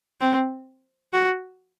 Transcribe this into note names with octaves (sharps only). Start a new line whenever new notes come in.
C4
F#4